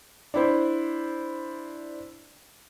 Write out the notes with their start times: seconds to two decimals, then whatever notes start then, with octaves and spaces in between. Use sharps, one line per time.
0.34 D4 E4 C5